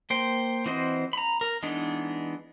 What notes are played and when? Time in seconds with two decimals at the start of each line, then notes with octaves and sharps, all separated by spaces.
0.10 A#3 C5 G5
0.66 E3 C4 F#4 C5 D#5
1.13 A#5 B5
1.41 A#4
1.63 E3 G#3 B3 D4 D#4